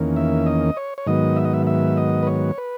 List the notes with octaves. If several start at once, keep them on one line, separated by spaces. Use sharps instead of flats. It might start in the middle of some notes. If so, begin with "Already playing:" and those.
Already playing: E2 D#3 A#3 C#4
E5
D#5
C#5
C#5
G#2 D#3 F#3 B3 D#5
E5
D#5
E5
E5
D#5
B4
C#5
B4